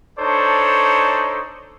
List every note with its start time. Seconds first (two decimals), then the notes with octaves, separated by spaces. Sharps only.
0.19 D4 D#4 A4 C5 C#5